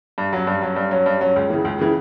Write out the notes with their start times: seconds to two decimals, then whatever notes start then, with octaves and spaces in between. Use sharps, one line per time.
0.18 G2
0.33 F#3 C#4
0.47 G2
0.62 F#3 C#4
0.76 G2
0.91 F#3 C#4
1.06 G2
1.21 F#3 C#4
1.36 C#2
1.50 C#3 E3
1.65 C#2
1.79 C#3 E3